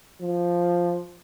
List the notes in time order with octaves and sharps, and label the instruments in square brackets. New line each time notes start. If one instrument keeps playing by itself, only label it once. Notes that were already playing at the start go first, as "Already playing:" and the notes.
[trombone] F3